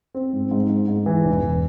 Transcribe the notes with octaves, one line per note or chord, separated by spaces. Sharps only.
C4
G#2
G#2
G#2
G#2
E3
E1
E1